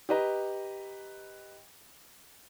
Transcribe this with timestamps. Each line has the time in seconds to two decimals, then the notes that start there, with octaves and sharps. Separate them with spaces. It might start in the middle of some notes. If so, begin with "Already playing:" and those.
0.09 G4 B4 D#5 A#5